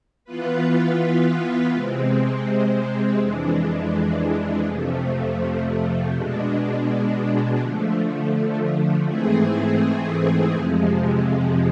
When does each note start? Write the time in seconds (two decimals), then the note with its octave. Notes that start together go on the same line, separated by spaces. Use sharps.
0.25 E3 B3 F4 B4
1.72 C3 G#3 C4
3.19 F2 E3 G#3 D4
4.66 F2 C3 F3 A3
6.13 B2 G#3 D4
7.60 D3 F3 A3
9.06 G#2 E3 A3 C4 G#4
10.53 F2 C3 F3 G#3